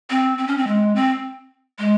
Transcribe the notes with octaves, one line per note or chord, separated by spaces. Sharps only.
C4
C4
C#4
C4
G#3
C4
G#3